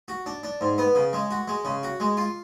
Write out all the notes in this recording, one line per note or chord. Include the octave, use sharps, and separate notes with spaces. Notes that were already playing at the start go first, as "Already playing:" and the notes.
F#4
D4
D4
G#2
B3
C#3
G#3
F#4
G#3
C#3
F#4
G#3
F4